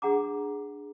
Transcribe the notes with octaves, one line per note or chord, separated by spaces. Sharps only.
D4 G#4 F#5 A#5 D6